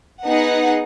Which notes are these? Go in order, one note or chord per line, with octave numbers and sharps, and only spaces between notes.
B3 D#4 G#4 F#5